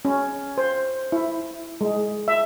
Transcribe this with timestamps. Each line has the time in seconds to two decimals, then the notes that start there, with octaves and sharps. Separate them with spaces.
0.05 C#4
0.58 C5
1.12 E4
1.81 G#3
2.28 E5